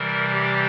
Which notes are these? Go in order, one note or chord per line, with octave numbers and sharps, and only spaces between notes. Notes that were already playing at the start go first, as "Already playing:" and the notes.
Already playing: C3 E3 G3 A#4
G4